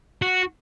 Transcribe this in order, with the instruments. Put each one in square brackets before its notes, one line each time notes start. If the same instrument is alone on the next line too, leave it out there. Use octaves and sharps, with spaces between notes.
[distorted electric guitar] F#4